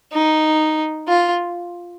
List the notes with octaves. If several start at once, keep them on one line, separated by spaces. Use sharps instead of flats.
D#4
F4